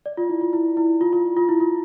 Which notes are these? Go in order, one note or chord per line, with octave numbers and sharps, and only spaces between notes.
D5
F4
E4
F4
E4
E4
F4
F4
F4
E4
F4